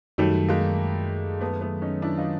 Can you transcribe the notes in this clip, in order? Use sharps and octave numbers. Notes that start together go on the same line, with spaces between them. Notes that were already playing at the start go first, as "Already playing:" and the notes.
F#2 D#3 F#3 G3 A3
G#3 A#3
A3 B3
A3 B3
C#4 D#4
D4 E4
D#4 F4